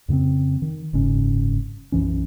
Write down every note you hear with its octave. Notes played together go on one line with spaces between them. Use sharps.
F2 C#3 B3 C4
D#3
F#1 G#2 C#3 C#4
B1 F#2 E3 C#4